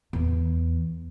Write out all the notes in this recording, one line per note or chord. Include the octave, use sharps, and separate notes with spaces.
E2